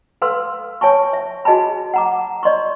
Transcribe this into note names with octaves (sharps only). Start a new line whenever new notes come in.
A4 B4 F5 C6 E6
C#5 G#5 A5 C#6
E5
F#4 G#4 D#5 G#5 A5 B5
F#5 A#5 D6
D5 D#5 C6 C#6